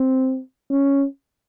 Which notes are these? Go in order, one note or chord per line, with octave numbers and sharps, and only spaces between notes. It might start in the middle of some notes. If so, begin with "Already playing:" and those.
Already playing: C4
C#4